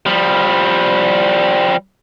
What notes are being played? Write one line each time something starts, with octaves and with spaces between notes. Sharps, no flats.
F3 G3